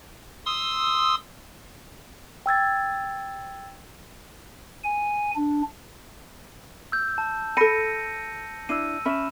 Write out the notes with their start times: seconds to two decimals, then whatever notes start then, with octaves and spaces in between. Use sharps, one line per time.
0.46 C6 D#6 E6
2.46 G5 E6 G#6 A6
4.84 G#5
5.36 D4
6.92 E6 G6
7.18 A5
7.57 A4 B5 A#6 C#7 D#7
8.69 D4 E4 E6 D#7
9.06 C#4 E5 B5 E7